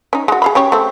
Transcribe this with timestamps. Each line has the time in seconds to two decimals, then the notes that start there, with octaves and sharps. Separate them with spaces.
0.13 C#4 D#4
0.28 G#3 F#4
0.42 G#4 F5 B5
0.55 C#4 G4 C#5
0.72 A3 C4